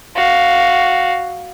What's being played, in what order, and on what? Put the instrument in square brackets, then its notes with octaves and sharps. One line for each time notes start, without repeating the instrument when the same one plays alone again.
[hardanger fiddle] F#4 F5